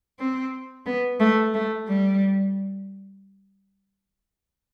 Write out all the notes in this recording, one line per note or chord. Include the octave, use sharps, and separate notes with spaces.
C4
B3
A3
A3
G3